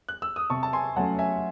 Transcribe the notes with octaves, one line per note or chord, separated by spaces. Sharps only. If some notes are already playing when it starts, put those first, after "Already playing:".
F#6
E6
D#6
C3 A5 C#6
A5
G#5 C6
F#3 A3 C#4 F#5 A5
E5 G#5